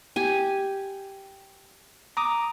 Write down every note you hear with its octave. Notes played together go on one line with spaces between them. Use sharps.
G4 G#5
A#5 D6 D#6